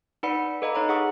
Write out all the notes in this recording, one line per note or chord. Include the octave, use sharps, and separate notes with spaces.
D#4 B4 D5 F#5 B5 C#7
A4 B4 D#5 F5 A#5 B5
D#4 C#5 A#5 C6
D#4 G#4 F#5 C#6 D#6 E6